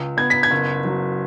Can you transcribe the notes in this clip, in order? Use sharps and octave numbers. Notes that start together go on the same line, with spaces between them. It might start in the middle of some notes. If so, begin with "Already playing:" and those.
Already playing: C#2
B3 G#6
B6
G#6
F#1
F#3